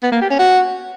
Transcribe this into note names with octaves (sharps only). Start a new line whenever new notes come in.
B3
A#3
G4
C#4
F#4